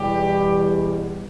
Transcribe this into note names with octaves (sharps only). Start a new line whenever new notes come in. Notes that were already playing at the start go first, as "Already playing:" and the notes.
Already playing: E2 B2 G3 G4